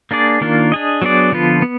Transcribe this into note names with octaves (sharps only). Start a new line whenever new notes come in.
A#3 D4 G#4 D5
D#3 A#3 D4 F4
D4 G#4 D#5
F#3 B3 D4 G#4 D5
D3 F3 B3 F4 B4
B3